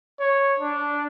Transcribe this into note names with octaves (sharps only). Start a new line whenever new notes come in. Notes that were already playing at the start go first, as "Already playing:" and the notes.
C#5
D4